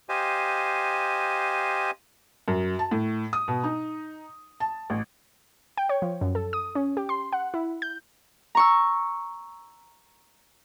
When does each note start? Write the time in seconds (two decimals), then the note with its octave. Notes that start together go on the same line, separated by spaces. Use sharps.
0.09 G4 C5 D#5 F5 G#5
2.48 F#2
2.79 A5
2.91 A2
3.33 D#6
3.48 B2
3.64 D#4
4.60 A5
4.90 A1
5.78 G5
5.89 C#5
6.02 F3
6.21 F#2
6.35 A4
6.53 D#6
6.75 C#4
6.97 G4
7.09 C6
7.33 F#5
7.54 E4
7.82 G6
8.55 A#5 C#6 E6